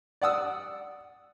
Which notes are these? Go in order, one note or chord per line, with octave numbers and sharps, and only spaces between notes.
D5 F#5 D#6 E6